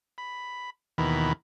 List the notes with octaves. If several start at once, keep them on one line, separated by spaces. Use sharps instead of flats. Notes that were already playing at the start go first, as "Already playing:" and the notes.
B5
D#2 B2 D#3 E3 B5